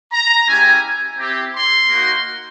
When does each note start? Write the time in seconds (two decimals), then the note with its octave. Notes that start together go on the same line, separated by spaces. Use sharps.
0.12 A#5
0.47 G#3 C#4 E4 G4 G#5
1.18 C4 E4 G4
1.54 C6
1.90 A#3 D#4 F#4